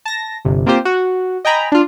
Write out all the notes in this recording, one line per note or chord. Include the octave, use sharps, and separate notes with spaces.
A5 A#6
G1 C3
A#3 C4 F4 G4 C5
F#4
D#5 G5 G#5 A#5 B5
D4 F4